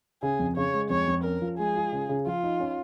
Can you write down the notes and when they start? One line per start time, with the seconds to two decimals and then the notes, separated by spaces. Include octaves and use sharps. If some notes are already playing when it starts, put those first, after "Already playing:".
0.23 C#3 G#4
0.39 F2
0.57 C#3 C#5
0.74 G#3
0.90 F2 C#5
1.07 F2
1.24 C#4 A#4
1.42 F3
1.58 G#3 G#4
1.75 F4
1.93 C#3
2.09 C#3
2.27 F3 F4
2.44 D#4
2.60 C#4